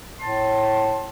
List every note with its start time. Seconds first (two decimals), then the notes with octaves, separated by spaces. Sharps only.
0.20 A2 A5 C6